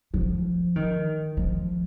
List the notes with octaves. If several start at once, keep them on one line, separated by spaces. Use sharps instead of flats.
F3
D#3
F3